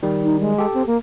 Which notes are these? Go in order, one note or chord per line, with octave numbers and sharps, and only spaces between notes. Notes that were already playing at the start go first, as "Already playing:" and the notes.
D#3 G3
D#4
G#3
G4 A4
C4
A#3